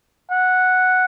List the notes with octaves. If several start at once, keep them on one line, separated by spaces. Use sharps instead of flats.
F#5